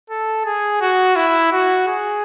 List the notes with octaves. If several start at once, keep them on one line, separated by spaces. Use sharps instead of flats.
A4
G#4
F#4
E4
F#4
G#4